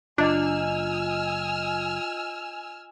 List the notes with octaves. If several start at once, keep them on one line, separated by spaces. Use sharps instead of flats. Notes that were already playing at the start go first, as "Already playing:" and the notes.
F#1 D4 F4 D#5 G#5 E6 F6